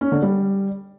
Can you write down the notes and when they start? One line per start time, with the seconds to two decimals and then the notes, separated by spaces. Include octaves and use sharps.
0.01 C#4
0.12 D3
0.22 G3